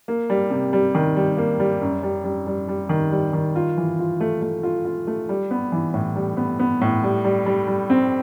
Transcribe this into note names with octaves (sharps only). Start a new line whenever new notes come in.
A#3
G3
C3
G3
D#3
G3
A#3
G3
F#2
G3
G3
G3
G3
D#3
G3
D#3
F4
E3
F4
A3
A3
F4
F4
A3
G3
B3
E3
A2
G3
B3
B3
A2
G3
G3
G3
G3
C4